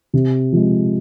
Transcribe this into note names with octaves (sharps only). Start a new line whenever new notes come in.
C3
F3 G#3